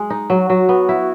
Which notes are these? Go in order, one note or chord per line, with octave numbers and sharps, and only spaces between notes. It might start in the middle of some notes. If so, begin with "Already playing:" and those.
Already playing: G#3
D#4
F#3 F#4
F#3
B3
E4